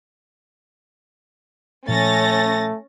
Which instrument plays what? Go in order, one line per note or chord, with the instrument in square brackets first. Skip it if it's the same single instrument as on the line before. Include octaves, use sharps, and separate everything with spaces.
[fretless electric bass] A#2 F3 [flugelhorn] A3 [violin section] C#4 A6 A#6